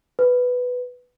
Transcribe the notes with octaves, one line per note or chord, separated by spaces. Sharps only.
B4